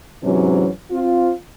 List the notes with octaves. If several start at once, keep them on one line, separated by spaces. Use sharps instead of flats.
G#2 C3 E3 F#3 C#4
C4 F4